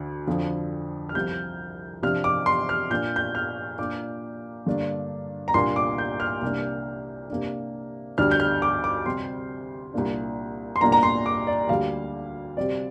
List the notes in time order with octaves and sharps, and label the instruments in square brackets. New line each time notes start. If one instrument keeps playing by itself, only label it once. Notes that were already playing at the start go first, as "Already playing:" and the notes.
Already playing: [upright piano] D2 D3
F2 D3 F3
F6
C2 C3 F3 G6
C3 F3 D4 F6
D6
C6
F6
A#2 A#3 D4 G6
G6
F6
A#2 A#3 D4 D6
G2 D3 A#3 D4
A#5
C2 A#2 A#3 D4 C6
D6
G6
F6
C2 C3 A#3 D4
C3 A#3 D4
D2 D3 G3 D4 F6
G6
F6
D6
D6
C3 G3 C4 C6
C2 A#2 A#3 D4
C6
C2 A#2 A#3 D4 A#5
A#5
C6
D6
D5
D2 D3 G3 A#3 F5
C3 G3 C4 D5